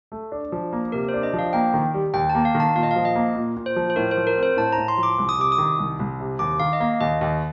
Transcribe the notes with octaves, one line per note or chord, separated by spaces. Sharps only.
A3
D4
F3
A#3
C3 A#4
C5
D4
D#5
F3
F5
A#3 G5
D#3
G3
D#2 G5
A5
A#3
F5
D#3
A5
A#2 F5
D#5
F5
F3
D#5
A#3
A#2
A#2
C5
F3
C5
A2 A#4
C5
F3
A#4
C4
C5
A2 A5
A#5
A2
C6
F3
D6
C2
D#6
C3 D6
D#6
D#3
C2
C2
C3
D#2 D6
D#3 F5
D#5
A#3 F5
D#2 D#5
D#2